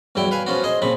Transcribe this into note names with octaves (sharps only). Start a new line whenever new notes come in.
E2 G2 F#3 E4 G5
B4 F5 G#5
F3 B3 C#4 F4 F#4
G#4 C5 D#5
A#1 C#3 F3 C4 B5